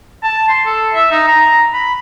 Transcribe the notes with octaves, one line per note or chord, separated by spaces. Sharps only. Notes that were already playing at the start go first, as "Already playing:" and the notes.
A5
C6
A4
E5
D#4
A#5
B5